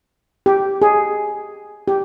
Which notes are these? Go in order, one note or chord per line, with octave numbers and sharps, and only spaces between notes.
G4
G#4
G4